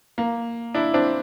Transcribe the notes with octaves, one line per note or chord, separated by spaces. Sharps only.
A#3
D4 E4
C4 D4